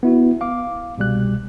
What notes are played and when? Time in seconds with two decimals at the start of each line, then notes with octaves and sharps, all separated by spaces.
0.03 B3 E4 F#4
0.41 F5 D6
0.98 C2 B2 G3 F#6